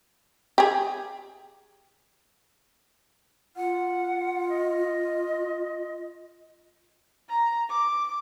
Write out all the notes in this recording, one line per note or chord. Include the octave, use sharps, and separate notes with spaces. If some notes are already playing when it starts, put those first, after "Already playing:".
G4 G#4
F4 F#5
D#5
A#5
D6